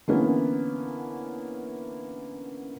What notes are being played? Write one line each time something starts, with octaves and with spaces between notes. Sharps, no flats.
D3 E3 A#3 B3 C#4